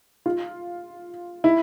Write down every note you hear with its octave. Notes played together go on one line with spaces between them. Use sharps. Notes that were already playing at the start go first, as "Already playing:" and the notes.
F4
E4